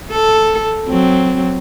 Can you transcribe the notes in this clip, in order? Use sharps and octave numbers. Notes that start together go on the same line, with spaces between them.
A4
F#3 C4